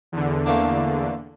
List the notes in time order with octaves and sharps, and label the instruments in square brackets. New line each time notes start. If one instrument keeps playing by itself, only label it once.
[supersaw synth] E2 D3
[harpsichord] A3 A#3 D4